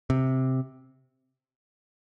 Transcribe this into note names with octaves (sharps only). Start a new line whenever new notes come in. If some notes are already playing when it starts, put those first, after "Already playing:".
C3